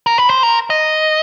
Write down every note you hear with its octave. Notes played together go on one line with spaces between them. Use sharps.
A#4
B4
C5
A#4
D#5